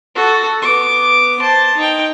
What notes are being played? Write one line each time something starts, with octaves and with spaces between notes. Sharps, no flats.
F#4 A4
B3 D6
C5 A5
D#4 G5